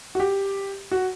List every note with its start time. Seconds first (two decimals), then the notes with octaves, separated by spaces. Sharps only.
0.15 F#4
0.20 G4
0.92 F#4